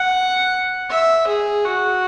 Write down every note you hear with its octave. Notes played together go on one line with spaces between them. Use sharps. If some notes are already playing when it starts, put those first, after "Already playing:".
Already playing: F#5
E5
G#4
F#4